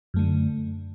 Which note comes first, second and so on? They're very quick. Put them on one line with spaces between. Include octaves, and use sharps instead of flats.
F#2 A3 D3